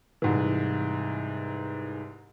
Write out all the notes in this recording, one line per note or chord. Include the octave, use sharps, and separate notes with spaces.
C2 G#2 E3